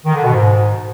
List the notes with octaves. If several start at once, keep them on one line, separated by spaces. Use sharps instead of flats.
D#3
D3
B2
G#2